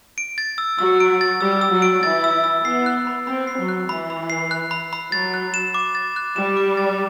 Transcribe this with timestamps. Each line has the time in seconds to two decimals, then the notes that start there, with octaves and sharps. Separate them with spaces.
0.18 D7
0.38 A6
0.58 E6
0.79 F#3 F#4 E6
1.00 D7
1.21 A6
1.41 G3 G4 E6
1.61 E6
1.72 F#3 F#4
1.82 D7
2.03 E3 E4 A6
2.24 E6
2.44 E6
2.65 B3 C7
2.86 F#6
3.07 B5
3.27 C4 B5
3.47 C7
3.58 F#3
3.68 F#6
3.89 E3 B5
4.10 B5
4.30 C7
4.51 F#6
4.71 B5
4.93 B5
5.12 F#3 A6
5.34 F#6
5.54 E7
5.74 D6
5.95 A6
6.16 F#6
6.36 G3 E7
6.57 D6
6.77 A6